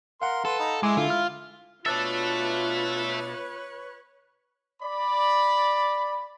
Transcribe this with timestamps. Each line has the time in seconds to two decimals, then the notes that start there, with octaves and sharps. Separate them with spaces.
0.22 A#4 F5 F#5 C6
0.45 A4 B4 C6
0.59 D#4 A#5 B5
0.83 G#3 E4 G#5 C6 D6
0.97 D3 F4
1.10 F6
1.86 B2 D4 F4 A4 B4 C#5 E5 A5
4.82 D5 B5